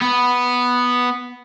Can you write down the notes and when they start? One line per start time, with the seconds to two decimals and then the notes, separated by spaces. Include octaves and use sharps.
0.02 B3